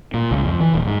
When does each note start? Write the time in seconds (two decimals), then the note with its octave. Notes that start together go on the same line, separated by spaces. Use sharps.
0.14 A#2
0.31 C#2
0.45 F2
0.60 E3
0.75 D#1
0.87 G#2